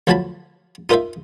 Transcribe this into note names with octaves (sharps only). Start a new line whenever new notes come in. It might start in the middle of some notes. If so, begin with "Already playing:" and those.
D2 F3 F#3 F5 A5 B5
D#4 F4 A#4 C5 E5 F5